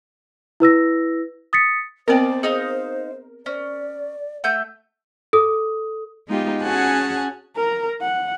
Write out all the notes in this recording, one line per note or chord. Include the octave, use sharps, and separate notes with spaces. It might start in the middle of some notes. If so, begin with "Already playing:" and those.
E4 B4 E6 A#6
D#6 A6 B6 C#7
B3 C4 A#4 C5 D5 D#5 G5
D#4 G#4 D#5 F5
C#4 C5 D5
A3 E5 F#5 G6
A4 D#6
G#3 B3 D#4 F4 G4
C#4 F#4 G#4 F#5 G#5 A5
A#4 A#5
F#5